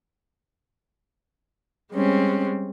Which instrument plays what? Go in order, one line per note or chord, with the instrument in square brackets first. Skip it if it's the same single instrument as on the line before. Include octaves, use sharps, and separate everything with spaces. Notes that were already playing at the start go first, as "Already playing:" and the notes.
[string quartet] G3 G#3 C4 C#4